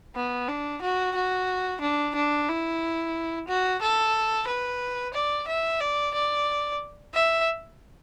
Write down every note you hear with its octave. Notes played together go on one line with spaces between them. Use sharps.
B3
D4
F#4
F#4
D4
D4
E4
F#4
A4
B4
D5
E5
D5
D5
E5